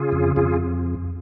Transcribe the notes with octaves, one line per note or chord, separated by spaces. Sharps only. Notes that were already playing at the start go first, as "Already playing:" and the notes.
Already playing: C#3 F4 G#4
F2
F2 F4 G#4